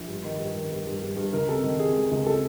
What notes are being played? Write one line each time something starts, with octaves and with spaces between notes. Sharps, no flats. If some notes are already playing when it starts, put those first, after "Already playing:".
Already playing: A#1
G2
D#3
G2
D#3
G2
G2
G2
G2
C#2 A#4
C3 A4
D#3
C3 G#4
G#3
C#2
C3 A4